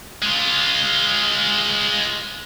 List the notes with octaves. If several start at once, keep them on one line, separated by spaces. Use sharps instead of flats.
G#3 F4